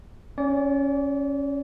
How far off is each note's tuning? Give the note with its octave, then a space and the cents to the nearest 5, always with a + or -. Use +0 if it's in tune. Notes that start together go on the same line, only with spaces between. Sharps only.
C#4 +0 D5 -35